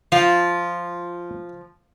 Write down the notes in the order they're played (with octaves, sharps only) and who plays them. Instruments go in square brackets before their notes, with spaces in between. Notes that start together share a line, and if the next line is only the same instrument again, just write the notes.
[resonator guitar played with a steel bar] F3 [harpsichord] F4 [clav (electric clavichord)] F5